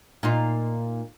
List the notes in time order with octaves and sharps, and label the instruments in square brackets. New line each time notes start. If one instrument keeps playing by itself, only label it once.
[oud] A#2 D#4 F4